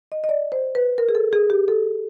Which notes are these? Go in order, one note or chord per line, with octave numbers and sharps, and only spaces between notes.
D#5
D#5
D5
C5
B4
A#4
G#4
A4
G#4
G4
A4